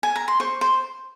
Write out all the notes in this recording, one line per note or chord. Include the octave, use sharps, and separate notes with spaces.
G#5
A#5
C6
C5 C#6
C5